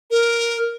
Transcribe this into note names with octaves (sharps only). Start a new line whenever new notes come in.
A#4